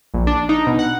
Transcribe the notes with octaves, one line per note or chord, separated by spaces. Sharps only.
A#1
D4
D#4
B2
F#5